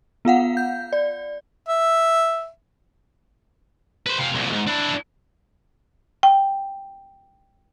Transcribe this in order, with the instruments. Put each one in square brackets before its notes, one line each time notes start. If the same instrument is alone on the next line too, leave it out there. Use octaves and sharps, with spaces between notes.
[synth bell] B3 F4 F5 F#5
G6
D5
[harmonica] E5
[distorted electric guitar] B4 C5
C3 F4
C2 A#2
D#2 G#2
D4 E4
[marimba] G5